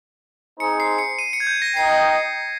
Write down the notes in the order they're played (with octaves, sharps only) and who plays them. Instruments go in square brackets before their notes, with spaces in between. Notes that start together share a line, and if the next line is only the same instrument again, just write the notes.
[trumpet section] C4 D#4 G#4 C5 [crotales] C#7
[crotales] C7
C#7
D#7
C#7
G#6
G6
A#6
[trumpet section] D#4 A#4 D#5 G5 [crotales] C7